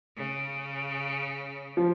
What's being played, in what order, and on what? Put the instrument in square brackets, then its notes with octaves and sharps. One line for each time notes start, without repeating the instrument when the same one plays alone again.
[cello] C#3
[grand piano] F3